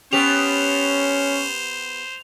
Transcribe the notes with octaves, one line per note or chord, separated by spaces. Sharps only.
B3 C#4 G4 C5 F7